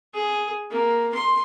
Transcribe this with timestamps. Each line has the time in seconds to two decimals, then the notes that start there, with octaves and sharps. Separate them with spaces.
0.14 G#4
0.70 A#3
1.14 C6